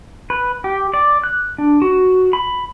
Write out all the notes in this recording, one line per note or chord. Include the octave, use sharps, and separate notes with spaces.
B4
G4
D5
F#6
D4
F#4
B5